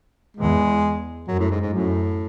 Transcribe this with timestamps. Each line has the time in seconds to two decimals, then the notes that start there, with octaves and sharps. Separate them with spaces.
0.37 E2 G#3
1.28 F#2 F#3
1.39 A2
1.51 G#2
1.62 G#2
1.73 F#2 A2